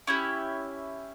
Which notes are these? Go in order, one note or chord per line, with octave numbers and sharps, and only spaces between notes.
C#4 E4 G4